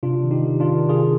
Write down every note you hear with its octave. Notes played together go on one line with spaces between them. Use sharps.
C3 D4 F4
D#3
D#4 G4
D#3
D4 F4
D#3
C3 F4 G#4